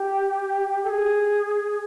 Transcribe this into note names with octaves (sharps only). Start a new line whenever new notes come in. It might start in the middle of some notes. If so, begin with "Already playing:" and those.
Already playing: G4
A4
G#4